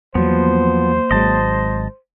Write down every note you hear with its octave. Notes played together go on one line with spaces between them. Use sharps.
E2 F3 F#3 A#3 B3 C5
G#1 F#3 G#3 D#5 A5